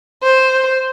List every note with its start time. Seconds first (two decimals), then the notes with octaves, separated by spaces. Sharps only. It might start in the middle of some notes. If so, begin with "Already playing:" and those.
0.23 C5